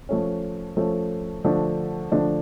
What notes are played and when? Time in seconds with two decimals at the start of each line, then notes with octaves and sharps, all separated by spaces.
0.09 F3 A3 C#4
0.77 F3 A3 C#4
1.44 D3 F3 A3 D4
2.12 D3 F3 A3 D4